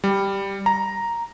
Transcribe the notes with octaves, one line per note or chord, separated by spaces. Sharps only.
G3
A#5